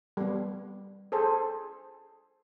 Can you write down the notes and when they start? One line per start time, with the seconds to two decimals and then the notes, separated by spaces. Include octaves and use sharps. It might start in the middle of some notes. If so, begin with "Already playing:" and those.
0.17 G3 B3
1.12 G#4 A4 C5